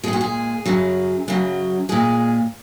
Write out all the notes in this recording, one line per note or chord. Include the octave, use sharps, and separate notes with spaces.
A#2 G#3 F#4 G#4
G#4
F#2 C#3 F#3
F#2 C#3 F#3
A#2 G#3 G#4